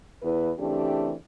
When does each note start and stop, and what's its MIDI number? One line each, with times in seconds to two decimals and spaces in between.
0.22 0.50 40
0.22 0.50 64
0.22 0.50 71
0.59 1.14 49
0.59 1.14 52
0.59 1.14 57
0.59 1.14 60
0.59 1.14 62
0.59 1.14 67